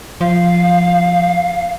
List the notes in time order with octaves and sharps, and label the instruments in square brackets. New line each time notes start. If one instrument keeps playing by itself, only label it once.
[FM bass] F3 [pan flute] F5